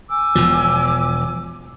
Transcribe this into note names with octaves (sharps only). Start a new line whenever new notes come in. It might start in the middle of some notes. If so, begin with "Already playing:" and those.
G#5 D6 E6
E1 B2 F3